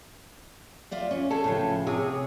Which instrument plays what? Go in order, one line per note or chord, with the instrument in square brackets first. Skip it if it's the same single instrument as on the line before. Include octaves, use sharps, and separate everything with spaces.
[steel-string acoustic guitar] F4 D5 E5
C#4
[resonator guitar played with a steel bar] G#4 A4
[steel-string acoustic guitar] A2 C#3 F3
[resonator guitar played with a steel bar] C3 G#4 [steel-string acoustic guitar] C#5